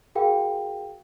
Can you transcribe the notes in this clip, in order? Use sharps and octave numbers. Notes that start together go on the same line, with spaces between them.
F#4 G#4 A#4 F5 G5